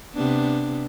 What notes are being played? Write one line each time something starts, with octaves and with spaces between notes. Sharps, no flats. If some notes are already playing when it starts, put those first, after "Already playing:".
C3 B3 D4